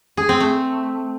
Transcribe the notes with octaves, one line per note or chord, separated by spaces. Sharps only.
G#4
C4
A3